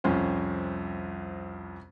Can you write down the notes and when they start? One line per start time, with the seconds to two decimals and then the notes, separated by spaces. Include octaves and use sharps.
0.04 C2 F2 C#4 C5